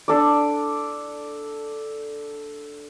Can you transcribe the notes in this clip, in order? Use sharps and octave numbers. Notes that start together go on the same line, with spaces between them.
D4 A4 D5